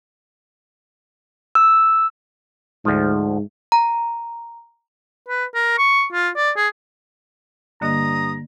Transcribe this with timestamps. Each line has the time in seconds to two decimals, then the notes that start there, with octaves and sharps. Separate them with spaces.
1.55 E6
2.85 D2 G#2 F3
3.72 A#5
5.28 B4
5.55 A#4
5.78 C#6
6.12 F4
6.36 D5
6.56 G#4
7.82 G2 D3 A#3 D#5 A#5 D#6